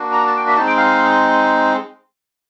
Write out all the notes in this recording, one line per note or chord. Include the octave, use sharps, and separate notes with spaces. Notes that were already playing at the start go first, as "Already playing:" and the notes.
Already playing: A#3 D4 F#4
A#5
A5
G5
E5
G#3 C4 D#4 A5
G5
F5